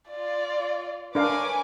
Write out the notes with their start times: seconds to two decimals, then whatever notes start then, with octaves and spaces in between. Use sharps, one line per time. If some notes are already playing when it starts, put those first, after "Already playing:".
0.10 F4 D5
1.15 D4 A#4 B4 C#5 F5 G#5 D6